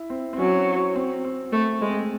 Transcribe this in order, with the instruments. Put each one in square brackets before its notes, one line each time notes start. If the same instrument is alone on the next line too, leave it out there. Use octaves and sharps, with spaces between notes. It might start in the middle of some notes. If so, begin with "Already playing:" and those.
Already playing: [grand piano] E4
C4
C4
[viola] F#3 [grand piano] C#4
[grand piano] C4
C4
[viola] A3 [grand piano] C4
[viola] G#3 [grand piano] A3
[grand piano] C4
A3